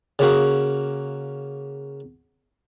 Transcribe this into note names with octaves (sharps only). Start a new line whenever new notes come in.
C#3 A#3 F#4